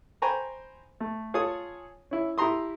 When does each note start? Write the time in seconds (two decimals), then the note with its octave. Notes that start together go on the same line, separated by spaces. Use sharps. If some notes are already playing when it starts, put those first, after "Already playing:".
0.22 C5 G5 G#5 A#5 B5 C#6
1.00 A3
1.34 F4 G#4 A4 C#5 G#5 D#6
2.11 C#4 E4
2.38 E4 G4 A#5 C6 D#6